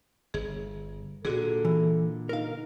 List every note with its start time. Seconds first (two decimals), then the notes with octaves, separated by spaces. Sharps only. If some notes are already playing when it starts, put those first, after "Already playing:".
0.34 G1 G#4
1.25 A#2 D3 F#4 G#4 A4
1.65 E3
2.29 D#4 A#4 F5